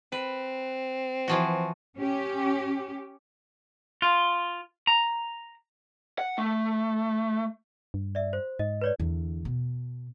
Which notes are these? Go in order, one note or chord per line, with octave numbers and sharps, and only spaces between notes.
C4 B4
E3 F3 F#4
C#4 G4
F4
A#5
F#5
A3
G2
D5 E5
C5
G#2 D#5
B4 C#5 D5
E2 D3
B2